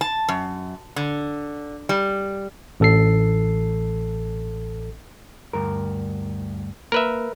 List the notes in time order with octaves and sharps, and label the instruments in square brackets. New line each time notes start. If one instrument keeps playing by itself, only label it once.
[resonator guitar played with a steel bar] A5
F#2
D3
G3
[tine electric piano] A1 A4 C7
[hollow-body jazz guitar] D2 G2 A#4
[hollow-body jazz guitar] A#3 [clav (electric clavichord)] A#4 B4 E5